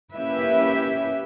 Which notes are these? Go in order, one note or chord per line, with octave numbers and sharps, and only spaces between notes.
A#3 C#4 E4 G4 B4 E5